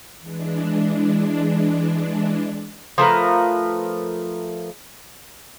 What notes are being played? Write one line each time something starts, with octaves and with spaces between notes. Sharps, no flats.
E3 G#3 D4
F3 A3 A#4 B4